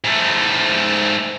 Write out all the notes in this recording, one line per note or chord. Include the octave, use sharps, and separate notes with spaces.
G#2 A3